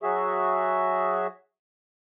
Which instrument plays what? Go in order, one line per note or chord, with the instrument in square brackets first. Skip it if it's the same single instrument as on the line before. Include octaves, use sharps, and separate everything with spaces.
[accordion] F#3 F#4 G#4 E5